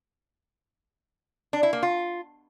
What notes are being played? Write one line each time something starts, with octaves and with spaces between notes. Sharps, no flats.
D4
E4
A#3
F4